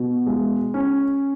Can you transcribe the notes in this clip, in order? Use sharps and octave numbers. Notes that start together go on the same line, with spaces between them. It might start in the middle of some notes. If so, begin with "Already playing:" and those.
Already playing: B2
G#3
C#4